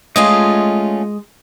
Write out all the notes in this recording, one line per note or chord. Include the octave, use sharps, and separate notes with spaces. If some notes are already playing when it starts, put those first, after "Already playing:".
G#3 A3 C#4 F4 D#5